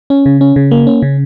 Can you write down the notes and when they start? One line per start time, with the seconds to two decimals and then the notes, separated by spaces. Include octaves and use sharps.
0.10 C#4
0.26 C#3
0.41 C#4
0.56 C#3
0.71 A#3
0.87 C#4
1.02 C#3